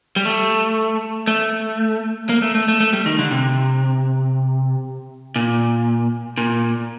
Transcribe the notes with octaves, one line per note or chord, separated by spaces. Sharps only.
G3
A3
A3
A#3
A3
A3
A3
A3
G3
D#3
D3
C3
A#2
A#2